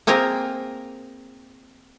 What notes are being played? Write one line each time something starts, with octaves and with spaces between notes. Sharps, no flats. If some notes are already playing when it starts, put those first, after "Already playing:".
A#3 C4 F4 G#4 A#4